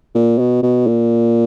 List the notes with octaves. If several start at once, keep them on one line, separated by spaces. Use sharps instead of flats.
A#2
B2
B2
A#2